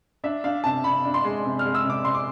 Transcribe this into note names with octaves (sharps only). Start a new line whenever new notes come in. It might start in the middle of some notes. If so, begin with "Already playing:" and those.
D4 E5
D4 F5
C3 A5
C3 B5
D4
C6
G#3
C3
F6
G#3
E6
C3 D6
C3 C6
D6